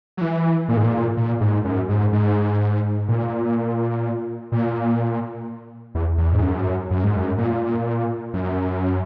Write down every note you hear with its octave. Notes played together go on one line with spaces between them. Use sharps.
F#3
E3
A#2
G#2
A#2
A#2
G#2
F#2
G#2
G#2
A#2
A#2
E2
E2
G#2
F#2
F#2
G#2
F#2
A#2
F#2